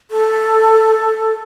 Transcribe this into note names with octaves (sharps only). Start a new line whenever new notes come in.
A4